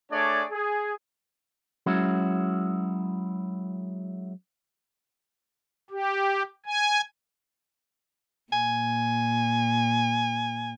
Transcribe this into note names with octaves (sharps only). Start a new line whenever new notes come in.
A3 D4 G#4 C#5 D5
G#4
F#3 G#3 C#4 E4 F#4
G4
G#5
A#2 G#5